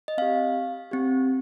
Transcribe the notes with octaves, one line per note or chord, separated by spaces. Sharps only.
D#5
C4 G4 F5
C4 G4